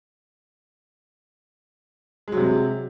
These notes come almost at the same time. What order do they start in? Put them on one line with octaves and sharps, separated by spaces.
G#3 F#3 C3